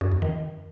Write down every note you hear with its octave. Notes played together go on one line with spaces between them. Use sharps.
F#2
E2
D#3